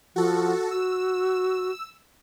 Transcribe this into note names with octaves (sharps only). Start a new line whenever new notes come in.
F3 F#4 A4
F#4 E6